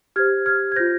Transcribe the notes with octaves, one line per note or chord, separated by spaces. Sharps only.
G4 C5 F6 G#6
F6 G#6
G#6
F4 C5 G6 A#6